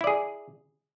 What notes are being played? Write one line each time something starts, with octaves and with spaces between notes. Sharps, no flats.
E4 G#4 D5